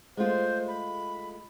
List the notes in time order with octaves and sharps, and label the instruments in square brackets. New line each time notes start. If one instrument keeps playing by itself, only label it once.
[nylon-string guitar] G#3 A3 F4 [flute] C5
[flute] B5